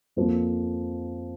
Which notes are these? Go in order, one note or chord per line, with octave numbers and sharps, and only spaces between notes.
F2 F3 A#3